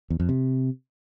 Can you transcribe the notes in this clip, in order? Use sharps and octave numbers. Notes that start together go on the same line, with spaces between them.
E2
F2
C3